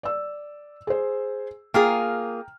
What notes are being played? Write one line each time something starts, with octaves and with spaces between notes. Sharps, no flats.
D5 E6
G#4 C5
A#3 F4 G#4 G5 A#5 F6